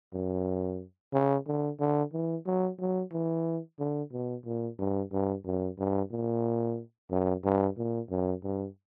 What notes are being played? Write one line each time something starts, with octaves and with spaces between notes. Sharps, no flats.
F#2
C#3
D3
D3
E3
F#3
F#3
E3
D3
B2
A#2
G2
G2
F#2
G2
A#2
F#2
G2
A#2
F#2
G2